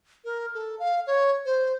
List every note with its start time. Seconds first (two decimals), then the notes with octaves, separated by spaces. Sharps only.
0.25 A#4
0.54 A4
0.79 F5
1.07 C#5
1.45 C5